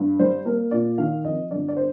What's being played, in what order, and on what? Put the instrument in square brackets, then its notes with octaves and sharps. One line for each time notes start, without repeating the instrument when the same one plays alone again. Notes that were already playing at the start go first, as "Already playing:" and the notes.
Already playing: [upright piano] G2
G3 C5
A#3 A#4
A#2 D5
D#3 F5
F2 D#5
G1 D5
D5
C5